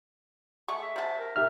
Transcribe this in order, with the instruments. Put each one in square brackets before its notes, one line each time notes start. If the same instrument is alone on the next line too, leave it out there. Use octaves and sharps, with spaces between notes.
[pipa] G#3 A3 C#6
[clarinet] E5
[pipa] C3 F4 A5
[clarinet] A#4
[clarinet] D#4 [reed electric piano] G4 E5 F6